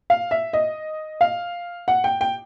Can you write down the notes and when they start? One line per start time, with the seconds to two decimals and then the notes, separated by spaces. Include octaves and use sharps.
0.10 F5
0.31 E5
0.53 D#5
1.21 F5
1.88 F#5
2.04 G5
2.21 G5